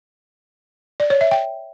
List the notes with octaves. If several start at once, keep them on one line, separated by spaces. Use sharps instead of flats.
D5
C#5
E5
G5